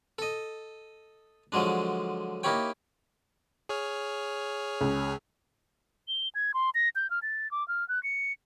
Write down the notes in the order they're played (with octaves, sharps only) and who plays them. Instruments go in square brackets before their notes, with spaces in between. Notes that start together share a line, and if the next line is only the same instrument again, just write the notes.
[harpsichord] A4 D#5
D3 F3 F#3 G#3 D4
A#3 D#4 E4 G4 C#5 G5
[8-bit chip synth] G#4 C#5 F6
[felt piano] C#2
[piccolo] G7
G#6
C6
A#6
G6
F6
A6
D6
F6
F#6
C#7